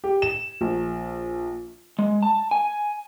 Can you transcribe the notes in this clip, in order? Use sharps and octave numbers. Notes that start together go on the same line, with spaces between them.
G4
E7
A#1
G#3
A5
G#5